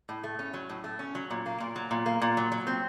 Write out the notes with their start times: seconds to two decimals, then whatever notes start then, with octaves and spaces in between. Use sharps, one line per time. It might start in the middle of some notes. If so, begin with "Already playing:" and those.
0.09 A2
0.24 A3
0.39 C#4
0.54 F#3
0.70 A2
0.84 A3
0.99 C#4
1.15 F#3
1.31 A#2
1.46 A#3
1.60 A#2
1.76 F#3
1.91 A#2
2.06 A#3
2.22 A#2
2.37 F#3
2.52 F#3
2.67 C4